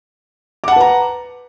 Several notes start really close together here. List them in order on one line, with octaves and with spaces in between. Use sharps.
D6 F#5 A5 B4 A#5